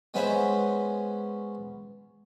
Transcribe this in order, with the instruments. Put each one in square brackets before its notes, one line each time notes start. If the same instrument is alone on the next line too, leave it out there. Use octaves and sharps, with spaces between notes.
[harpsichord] G#3 B3 C#4 B4 C5 E5